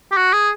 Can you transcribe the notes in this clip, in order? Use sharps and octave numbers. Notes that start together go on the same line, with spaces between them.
G4
F#4
G#4